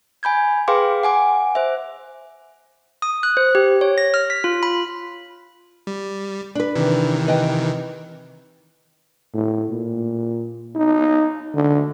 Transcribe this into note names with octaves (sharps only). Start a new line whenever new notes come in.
G#5 B5 G6 G#6
G#4 B4 F5 G5 C6 D6
F#5 G#5 D6
C5 E5
D#6
F#6
C5
G4
C#5
A#6
F6
B6
F4
B5
G3
D4 B4
C3 D#3 E3
B4 D#5 G5
A2
A#2
D#4
D3